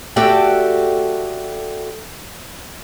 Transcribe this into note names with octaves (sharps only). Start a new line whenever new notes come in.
A3 F#4 G4 A4 D5 G5